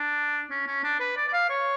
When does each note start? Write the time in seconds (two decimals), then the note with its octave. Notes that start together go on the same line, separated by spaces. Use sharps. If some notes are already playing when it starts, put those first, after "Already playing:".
Already playing: D4
0.50 C#4
0.67 C#4
0.84 D4
1.00 B4
1.17 D5
1.28 D5
1.33 F5
1.50 C#5